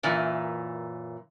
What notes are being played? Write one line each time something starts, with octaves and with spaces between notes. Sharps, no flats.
F#2 A#2 E3